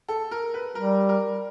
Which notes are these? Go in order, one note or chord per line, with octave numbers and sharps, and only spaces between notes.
A4
A#4
B4
G3 A#4
A#4